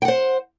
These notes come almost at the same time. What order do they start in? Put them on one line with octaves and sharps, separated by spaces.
G5 F#5 C5